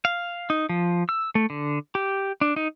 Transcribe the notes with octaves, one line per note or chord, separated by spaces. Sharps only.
F5
D#4
F3
E6
A3
D3
G4
D4
D#4